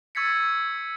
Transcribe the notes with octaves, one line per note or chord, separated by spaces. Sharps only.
C#6 E6 G#6 A6 B6 C#7